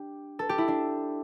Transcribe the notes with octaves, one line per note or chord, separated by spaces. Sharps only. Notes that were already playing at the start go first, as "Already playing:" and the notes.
Already playing: D4 G4
A4
G4
E4
D4